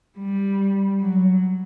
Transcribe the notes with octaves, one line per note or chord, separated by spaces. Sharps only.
G3
F#3